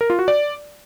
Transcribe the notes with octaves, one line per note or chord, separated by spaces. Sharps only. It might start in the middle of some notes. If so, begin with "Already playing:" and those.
A#4
F4
F#4
D5